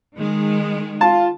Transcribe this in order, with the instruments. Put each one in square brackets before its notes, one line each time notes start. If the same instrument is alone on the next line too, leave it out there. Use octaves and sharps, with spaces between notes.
[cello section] D#3 G#3
[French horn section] F4 [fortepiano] A5